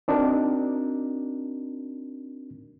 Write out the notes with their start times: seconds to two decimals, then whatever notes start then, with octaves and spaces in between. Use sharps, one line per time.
0.08 C4 D4 D#4 F#4 A#4